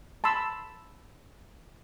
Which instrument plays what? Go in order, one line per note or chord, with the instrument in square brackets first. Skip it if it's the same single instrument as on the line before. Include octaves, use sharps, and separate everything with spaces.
[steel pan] A5 B5 C6 E6